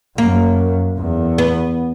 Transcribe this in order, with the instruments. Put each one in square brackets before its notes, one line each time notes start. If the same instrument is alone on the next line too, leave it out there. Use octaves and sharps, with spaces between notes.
[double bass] F#2 [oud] A#3
[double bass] E2
[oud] B3